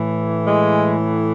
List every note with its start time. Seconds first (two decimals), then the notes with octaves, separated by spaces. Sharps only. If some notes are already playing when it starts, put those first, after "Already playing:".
Already playing: A2 E3
0.45 G#3